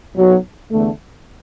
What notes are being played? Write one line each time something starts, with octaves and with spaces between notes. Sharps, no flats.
B1 B2 F#3
E2 D3 A3